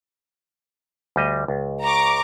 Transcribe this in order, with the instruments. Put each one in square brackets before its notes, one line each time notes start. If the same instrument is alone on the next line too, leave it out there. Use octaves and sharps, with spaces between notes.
[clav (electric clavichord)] D2 G3 D#5
C#2
[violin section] A#5 C#6 D6